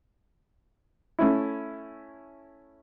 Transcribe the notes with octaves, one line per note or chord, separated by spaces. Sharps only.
A3 C#4 E4